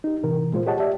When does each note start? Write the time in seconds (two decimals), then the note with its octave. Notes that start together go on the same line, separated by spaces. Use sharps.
0.04 D#4 G4
0.23 A2 C3 E3 A#4
0.52 A#2 G#3 F4 C5
0.67 G4 G#4 C#5 D#5 F#5 A5
0.80 G4 D5 E5